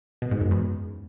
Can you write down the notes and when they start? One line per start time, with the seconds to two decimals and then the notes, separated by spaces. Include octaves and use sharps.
0.22 B2
0.31 G#2
0.41 F#2
0.51 E2